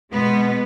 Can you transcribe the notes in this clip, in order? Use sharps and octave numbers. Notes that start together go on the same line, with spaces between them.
B2 G#3 B3